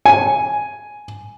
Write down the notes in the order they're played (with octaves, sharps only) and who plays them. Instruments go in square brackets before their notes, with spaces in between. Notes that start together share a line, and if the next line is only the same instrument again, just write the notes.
[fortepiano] G#5